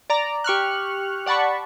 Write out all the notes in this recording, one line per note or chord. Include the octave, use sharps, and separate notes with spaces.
D5 A#5
G4 C#6 F6 F#6
D5 F#5 A5 B5 C#6